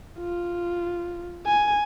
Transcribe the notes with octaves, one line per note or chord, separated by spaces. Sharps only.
F4
G#5